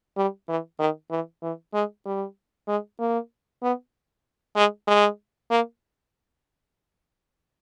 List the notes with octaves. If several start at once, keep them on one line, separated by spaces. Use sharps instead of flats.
G3
E3
D#3
E3
E3
G#3
G3
G#3
A#3
B3
G#3
G#3
A#3